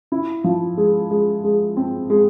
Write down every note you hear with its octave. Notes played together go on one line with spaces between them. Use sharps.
E4
F3
G#3
G#3
G#3
C4
G#3